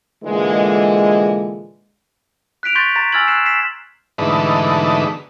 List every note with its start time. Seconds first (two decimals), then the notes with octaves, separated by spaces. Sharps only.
0.24 A#2 D3 E3 G#3
2.63 F#6 B6 D7 F7
2.75 C6 C#6 G6 A6 B6
2.95 A#5 A6 B6
3.12 G#5 E6 F6 G#6 A6 F#7
3.28 F6 F#6 C7 E7
3.46 B6 C7 E7
4.18 G#2 B2 D3 E3 A3 D#4